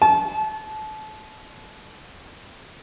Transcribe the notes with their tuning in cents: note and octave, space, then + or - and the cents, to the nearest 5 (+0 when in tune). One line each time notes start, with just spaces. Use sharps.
A5 -30